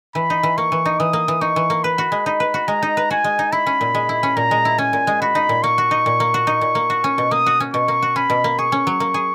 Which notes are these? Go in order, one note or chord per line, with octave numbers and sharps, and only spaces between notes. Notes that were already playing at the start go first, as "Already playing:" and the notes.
E3 B5
D#4
E3
A#3 C#6
E3
D#4
E3 D#6
A#3
E3
D#4 C#6
E3
A#3
B4 B5
F#4
G#3
D#4 B5
B4
F#4
G#3 A#5
D#4
B4
F#4 G#5
G#3
D#4
E4 B5
C#4
A#2
G#3
E4
C#4
A#2 A#5
G#3
E4
C#4 G#5
A#2
G#3
F#4 B5
D#4
A#2
A#3 C#6
F#4
D#4
A#2
A#3
F#4
D#4
A#2
A#3
F#4
C#4
B2
A#3 D#6
F#4
C#4
B2 C#6
A#3
F#4
C#4 B5
B2
A#3
G#4 C#6
C#4
F#3
A#3
G#4